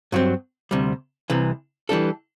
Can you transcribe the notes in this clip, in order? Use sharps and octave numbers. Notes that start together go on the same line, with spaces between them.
G2 F#3 C4
D2 C3 G3
C2 C3 E3
E3 G3 D4 A4